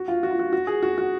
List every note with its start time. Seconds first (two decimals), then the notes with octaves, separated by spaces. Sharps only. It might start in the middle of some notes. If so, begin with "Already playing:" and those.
Already playing: F#4
0.08 F4
0.23 F#4
0.31 F4
0.39 F#4
0.53 F#4
0.67 G#4
0.83 F#4
0.98 F#4